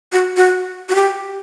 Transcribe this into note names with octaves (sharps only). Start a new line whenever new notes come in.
F#4
F#4
F#4
G4